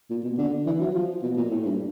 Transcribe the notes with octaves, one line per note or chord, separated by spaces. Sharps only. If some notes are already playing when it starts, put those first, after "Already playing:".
A#2
B2
D3
E3
F#3
F3
B2
A#2
A2
G2